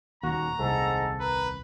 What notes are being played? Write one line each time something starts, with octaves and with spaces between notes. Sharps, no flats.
D#1 D#2 F#4 A#5
D#1 C2 G#2 A4
A#4 B4